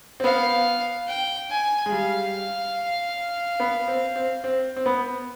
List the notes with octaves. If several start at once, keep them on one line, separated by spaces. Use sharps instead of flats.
C4
B3 F5
G5
G#5
G#3
G3 F5
B3
C4
C4
C4
C4
B3